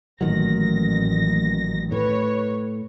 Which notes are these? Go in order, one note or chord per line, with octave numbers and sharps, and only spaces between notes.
A1 A#2 D#3 F#3 A#6
A2 B4 C#5